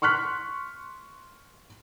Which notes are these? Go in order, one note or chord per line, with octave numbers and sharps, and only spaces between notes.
C6 C#6 F6 F#6 B6